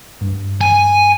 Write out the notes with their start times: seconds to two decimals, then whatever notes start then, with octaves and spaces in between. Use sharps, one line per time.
0.21 G2
0.61 G#5